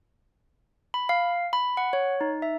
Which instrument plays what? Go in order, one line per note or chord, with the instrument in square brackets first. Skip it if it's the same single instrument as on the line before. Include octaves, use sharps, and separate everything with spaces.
[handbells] B5
F5
B5
F#5
C#5
D#4
E5